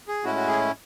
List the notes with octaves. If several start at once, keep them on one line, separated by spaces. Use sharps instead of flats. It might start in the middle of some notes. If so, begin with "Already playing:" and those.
G#4
A2 G#3 C#4 E4 F#4
F#4
G#4